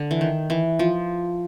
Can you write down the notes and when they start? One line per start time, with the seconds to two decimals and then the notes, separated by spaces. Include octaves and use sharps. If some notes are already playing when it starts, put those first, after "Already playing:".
Already playing: D3
0.11 E3
0.21 D#3
0.50 E3
0.79 F3